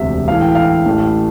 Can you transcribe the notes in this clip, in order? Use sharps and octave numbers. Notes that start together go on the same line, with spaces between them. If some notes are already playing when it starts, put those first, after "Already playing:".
Already playing: E1 D2 C3 E5
A2 E3 A3 E4 F5
G5
F5
A1 A2 E3 A3